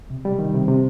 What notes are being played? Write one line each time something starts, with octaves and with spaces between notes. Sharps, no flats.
C3
G3
D#3
C3
C3